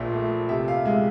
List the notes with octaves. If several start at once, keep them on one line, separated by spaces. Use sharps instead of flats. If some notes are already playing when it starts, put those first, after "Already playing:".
Already playing: A#1 A#2 F3 E5
A3
C3 E5
F5
G#3 E5